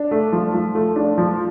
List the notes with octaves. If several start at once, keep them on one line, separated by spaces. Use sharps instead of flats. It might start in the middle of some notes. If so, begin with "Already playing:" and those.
Already playing: D4
A3
F3
F3
A3
D4
F3